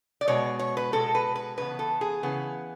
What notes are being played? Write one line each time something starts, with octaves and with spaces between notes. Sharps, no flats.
D5
B2 G#3 B3 C#5
C#5
B4
B2 G#3 B3 A4
B4
B4
C#3 E3 B3 B4
A4
G#4
C#3 E3 B3